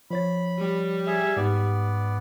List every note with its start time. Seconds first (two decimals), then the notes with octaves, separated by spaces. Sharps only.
0.11 F3 C#5 B5 A6
0.58 G3
1.07 G#4 E5
1.37 G#2 B3 D5